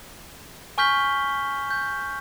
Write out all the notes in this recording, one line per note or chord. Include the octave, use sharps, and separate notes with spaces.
G#5 C#6 F6 G6 B6 G7
G6